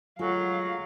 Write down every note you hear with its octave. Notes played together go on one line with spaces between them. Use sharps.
D2 F#3 G#3 F4 F5